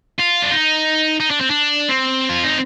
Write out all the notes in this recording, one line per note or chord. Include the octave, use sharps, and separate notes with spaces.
F4
D4
D#4
D#4
D4
C4
D4
C4
F4
D#4